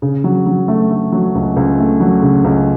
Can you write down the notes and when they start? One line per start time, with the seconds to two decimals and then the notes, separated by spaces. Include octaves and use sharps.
0.02 C#3
0.24 F#3
0.46 F#3
0.68 A3
0.91 A3
1.12 F#3
1.35 C#2
1.56 C#2
1.79 A3
2.00 F#3
2.22 C#3
2.44 C#2